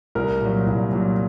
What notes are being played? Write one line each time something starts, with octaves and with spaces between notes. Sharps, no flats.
C2 A#4
A#2 F#3
C2
A#2 F#3